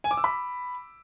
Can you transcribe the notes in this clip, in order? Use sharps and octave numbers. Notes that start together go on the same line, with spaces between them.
G#5
D6
E6
B5